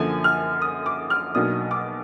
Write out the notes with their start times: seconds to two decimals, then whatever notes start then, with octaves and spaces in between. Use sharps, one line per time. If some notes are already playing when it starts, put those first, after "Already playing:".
Already playing: F#2 D3 F3 A#3 G#5
0.24 F6
0.62 D#6
0.86 D6
1.10 F6
1.35 B1 B2 F#3 A#3 D4 D#6
1.71 D6